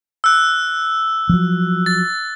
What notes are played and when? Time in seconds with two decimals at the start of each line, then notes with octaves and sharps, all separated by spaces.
0.24 E6 F#6
1.29 F3 F#3
1.86 A6